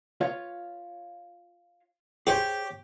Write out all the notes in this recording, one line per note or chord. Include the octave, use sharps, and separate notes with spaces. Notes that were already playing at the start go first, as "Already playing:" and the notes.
F4 C#5 F5
G4 G#4 C5 C#5